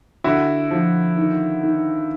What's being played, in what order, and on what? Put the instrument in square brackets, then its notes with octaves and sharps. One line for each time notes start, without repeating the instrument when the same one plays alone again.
[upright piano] D3 [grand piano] E4 F#4
[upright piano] F3
D#3
D#3